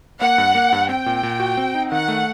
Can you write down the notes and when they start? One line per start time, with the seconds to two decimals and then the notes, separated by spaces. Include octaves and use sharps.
0.21 A#3 F#5
0.38 G2
0.55 A#3
0.72 G2
0.89 C4 G5
1.06 A#2
1.23 A#2
1.40 F#4
1.58 C4
1.75 D#4
1.91 D#3 F#5
2.08 A3